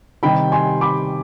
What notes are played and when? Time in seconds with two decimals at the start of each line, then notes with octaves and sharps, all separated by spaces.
0.23 C3 D#3 G3 G5 B5
0.52 G#5 C6
0.81 B5 D6